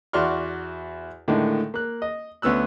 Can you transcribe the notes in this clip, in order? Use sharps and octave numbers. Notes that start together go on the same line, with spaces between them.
E2 F#4 D5 C6 C#6 F6
A2 D3 D#3 G#3
A#3 F#6
D#5
D2 B3 C#4 E6 F#6